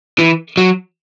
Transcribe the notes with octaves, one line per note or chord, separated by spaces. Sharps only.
E3
F#3